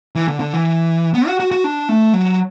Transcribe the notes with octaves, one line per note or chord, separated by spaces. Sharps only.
E3
D3
D3
E3
B3
F#4
F#4
F#4
D4
A3
F#3